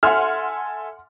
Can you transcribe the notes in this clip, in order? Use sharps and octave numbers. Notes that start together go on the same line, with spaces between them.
A4 E5 F#5 G#5 C6 F6